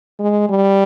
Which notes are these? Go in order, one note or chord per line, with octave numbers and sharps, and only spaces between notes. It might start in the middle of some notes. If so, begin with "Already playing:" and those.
G#3
G3